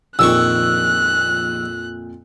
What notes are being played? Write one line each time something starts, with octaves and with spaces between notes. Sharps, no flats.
A#1 F2 A#2 D#3 C#6 E6 F#6